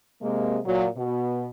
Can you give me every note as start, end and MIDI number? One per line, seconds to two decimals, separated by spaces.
0.22 0.60 48
0.22 0.60 56
0.22 0.60 58
0.65 0.87 46
0.65 0.87 54
0.96 1.50 47